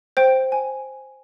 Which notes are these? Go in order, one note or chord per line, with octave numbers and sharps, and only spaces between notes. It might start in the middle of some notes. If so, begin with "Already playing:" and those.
C5 G5
G#5